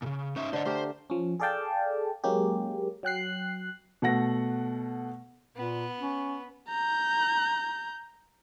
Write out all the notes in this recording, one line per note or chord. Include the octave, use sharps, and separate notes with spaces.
A#2 C#3
C#4 D#4 C#5 E5
D3 C5 D#5
A3 G4 A#4 C5
F3 C#4
G#4 A4 D5 F5 G5 A5
F#3 G#3 A#3 C#4 G4
F#3 G5 F#6 C7
B2 A3 F#5 A#6
A#2 B3
C#4
A#5 G6